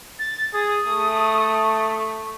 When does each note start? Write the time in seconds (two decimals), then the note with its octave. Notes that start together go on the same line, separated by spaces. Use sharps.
0.19 A6
0.53 G#4 D#6
0.87 A3